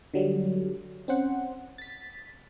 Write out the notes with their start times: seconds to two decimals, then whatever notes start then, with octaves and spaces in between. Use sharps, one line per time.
0.14 D3 F#3 G3
1.08 C4 C#4 C5 F#5
1.78 A6 B6